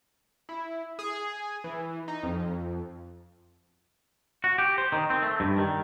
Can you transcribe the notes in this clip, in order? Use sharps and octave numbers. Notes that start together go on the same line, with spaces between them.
E4
G#4
E3
D#4
F2
F#4
G4
C5
D#3
C4
A3
G2
D#3